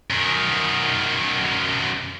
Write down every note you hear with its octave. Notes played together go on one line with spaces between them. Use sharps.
F#2 D#3